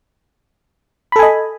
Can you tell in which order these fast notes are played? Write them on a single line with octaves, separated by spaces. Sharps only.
B5 A4 G#5 D#5